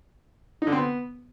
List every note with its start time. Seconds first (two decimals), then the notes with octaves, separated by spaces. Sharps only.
0.62 D#4
0.67 D3
0.72 C4
0.77 B3